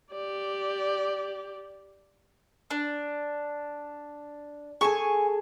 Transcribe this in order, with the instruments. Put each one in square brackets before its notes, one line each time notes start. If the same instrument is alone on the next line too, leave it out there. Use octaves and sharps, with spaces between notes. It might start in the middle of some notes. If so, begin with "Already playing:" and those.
[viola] G4 D5
[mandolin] D4
[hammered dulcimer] G#4 A4 [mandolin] G#5 A5 C#6